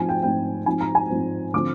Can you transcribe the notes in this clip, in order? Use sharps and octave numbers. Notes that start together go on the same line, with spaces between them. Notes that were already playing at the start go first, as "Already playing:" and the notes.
Already playing: G#2 F3 C4 G#5
G5
G#2 F3 C4 G5
G#2 F3 C4 G#5
A#5
G#5
G#2 F3 C4
D3 F3 C4 D6